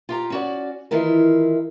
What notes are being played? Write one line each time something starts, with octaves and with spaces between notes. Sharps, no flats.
F4 G4 A#5
C#4 F#4 D5
D#3 E3 E4 F4 A#4